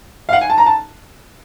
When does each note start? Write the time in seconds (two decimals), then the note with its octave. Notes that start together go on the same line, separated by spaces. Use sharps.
0.29 F5
0.33 F#5
0.41 G#5
0.50 A5
0.58 A#5
0.66 A5